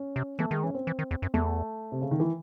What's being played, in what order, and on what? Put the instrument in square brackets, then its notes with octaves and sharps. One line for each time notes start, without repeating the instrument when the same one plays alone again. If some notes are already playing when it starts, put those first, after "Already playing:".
Already playing: [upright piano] C#4
[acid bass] C3
[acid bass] E3 [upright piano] A3
[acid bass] D#3 [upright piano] G#3
[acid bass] E3 [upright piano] C#4
[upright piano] C4
[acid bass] E3
D#3
E2
F#2
[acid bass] E2 [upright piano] A3
[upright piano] C3
C#3
D#3
E3